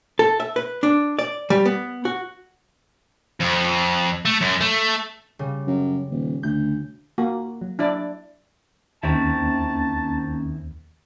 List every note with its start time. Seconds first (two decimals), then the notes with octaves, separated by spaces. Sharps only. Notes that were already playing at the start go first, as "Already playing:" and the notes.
0.19 A4
0.40 E5
0.56 B4
0.83 D4
1.19 D5
1.50 G3
1.65 B3
2.05 F#4
3.40 F2
4.25 A3
4.41 F#2
4.61 A3
5.39 C#3 G3
5.67 F#2
6.10 D#1
6.43 D2 G6
7.18 A#3 F#4
7.61 F#3
7.79 D4 E4 D5
9.03 D#2 D#3 A#3 C4 C#4 E4 A5